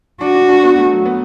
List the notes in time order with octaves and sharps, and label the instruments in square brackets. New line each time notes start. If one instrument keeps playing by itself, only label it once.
[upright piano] D4 [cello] F#4
[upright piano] D4
D4
B3
A3
F#3
B3